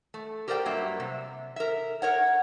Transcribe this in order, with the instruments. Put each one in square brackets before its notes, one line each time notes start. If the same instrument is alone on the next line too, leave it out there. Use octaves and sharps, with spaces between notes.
[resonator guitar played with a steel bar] A3
G4 A#4 C5 D5 E5 G5
G2 F#3 A#3 E5
C3
A#4 E5
A#4 C#5 F#5